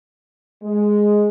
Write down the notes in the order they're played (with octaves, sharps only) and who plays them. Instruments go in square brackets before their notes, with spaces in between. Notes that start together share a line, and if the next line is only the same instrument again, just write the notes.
[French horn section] G#3